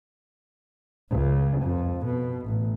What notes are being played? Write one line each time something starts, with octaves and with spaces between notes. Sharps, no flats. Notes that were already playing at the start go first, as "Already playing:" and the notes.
C#2
F2
B2
A1